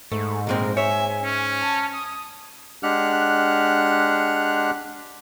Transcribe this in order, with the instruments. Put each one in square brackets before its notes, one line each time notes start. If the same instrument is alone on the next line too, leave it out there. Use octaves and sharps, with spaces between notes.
[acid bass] G#2 [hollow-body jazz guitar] A3
[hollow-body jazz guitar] A#2 G#3 C4 [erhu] A#4
[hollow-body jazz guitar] C#5 [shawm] E5 [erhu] G#5
[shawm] C#4
[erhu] A5
D#6
[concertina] G#3 D4 G4 F#5 F6 F#6